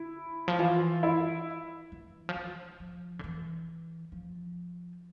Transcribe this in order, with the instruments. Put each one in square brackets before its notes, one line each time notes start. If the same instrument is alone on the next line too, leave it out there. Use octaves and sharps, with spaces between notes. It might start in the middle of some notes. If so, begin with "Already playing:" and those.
Already playing: [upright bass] D3 [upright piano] E4
[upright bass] F3
[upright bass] E3 [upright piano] F4
[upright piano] E4
[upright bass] E3
F3
E3
F3
D3
E3
F3